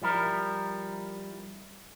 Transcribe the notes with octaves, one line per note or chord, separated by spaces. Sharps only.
F3 G3 E4 A#4